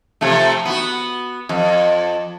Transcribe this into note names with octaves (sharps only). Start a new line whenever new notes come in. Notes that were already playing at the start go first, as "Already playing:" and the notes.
C3 F3 A3
B3 F#4
F2